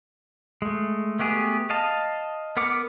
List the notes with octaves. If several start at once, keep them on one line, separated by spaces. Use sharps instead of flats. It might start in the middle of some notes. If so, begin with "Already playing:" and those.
G#3 A3
A3 B3 G4 G#4
D#5 F5 A5
B3 A#4 F#5 D6